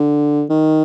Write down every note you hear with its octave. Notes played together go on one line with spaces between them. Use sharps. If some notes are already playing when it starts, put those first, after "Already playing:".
Already playing: D3
D#3